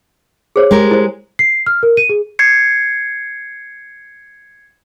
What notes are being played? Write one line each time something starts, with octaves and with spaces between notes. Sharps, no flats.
G#4 C5 C#5
G#3 G4 A#4
E4 C5
C7
F6
A#4
D#7
G#4
G#6 C7 C#7